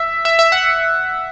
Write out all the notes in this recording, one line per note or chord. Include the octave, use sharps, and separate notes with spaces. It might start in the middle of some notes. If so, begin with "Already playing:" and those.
Already playing: E5
E5
E5
F#5